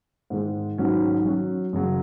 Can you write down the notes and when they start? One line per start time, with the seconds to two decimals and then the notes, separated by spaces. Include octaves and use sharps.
0.30 G#2 D#3 G#3
0.78 G#2 D#3 F#3 C#4 F#4
1.25 F#3 C#4 F#4
1.73 F#2 C#3 F#3